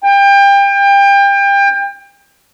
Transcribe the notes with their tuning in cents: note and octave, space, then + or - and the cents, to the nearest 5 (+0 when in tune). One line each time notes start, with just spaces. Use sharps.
G5 +30